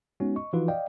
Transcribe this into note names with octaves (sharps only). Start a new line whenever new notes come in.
G#3 B3 C#4 D#4 F#4
D#5 C#6
E3 F3 D#4 F4 F#4 B4
D5 D#5 F5 G5